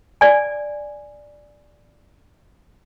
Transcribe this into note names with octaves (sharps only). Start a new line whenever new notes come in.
D5 G#5